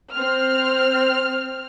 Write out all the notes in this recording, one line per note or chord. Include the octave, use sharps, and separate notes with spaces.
C4 F6